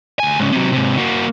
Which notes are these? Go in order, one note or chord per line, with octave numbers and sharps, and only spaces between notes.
D2 G#5
G#2 C#3
C3 F#3
G#2 C3
A#3 F#4